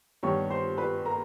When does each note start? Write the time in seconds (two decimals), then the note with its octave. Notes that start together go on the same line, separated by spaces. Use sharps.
0.23 G2 D#3 G3 B3 C#5 C#6
0.50 C5 C6
0.77 B4 B5
1.06 A#4 A#5